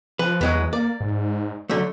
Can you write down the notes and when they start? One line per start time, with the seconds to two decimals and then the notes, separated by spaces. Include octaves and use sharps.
0.19 F3 B4
0.41 E2 F#3 G#3 B3
0.73 A#3 D5
1.00 G#2
1.70 D3 F#3 A3